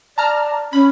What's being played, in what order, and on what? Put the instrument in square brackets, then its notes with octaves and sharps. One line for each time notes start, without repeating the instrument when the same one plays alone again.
[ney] D5 [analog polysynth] A5 A#5 F6
[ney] C#4 [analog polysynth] B5